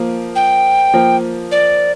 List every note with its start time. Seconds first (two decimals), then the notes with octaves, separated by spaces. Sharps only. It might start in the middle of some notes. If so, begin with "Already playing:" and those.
Already playing: F3 A#3
0.35 G5
0.94 F3 A#3
1.51 D5